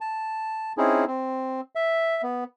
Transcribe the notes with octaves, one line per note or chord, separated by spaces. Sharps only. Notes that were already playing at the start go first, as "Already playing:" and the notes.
A5
C4 C#4 D#4 E4 G#4
C4
E5
B3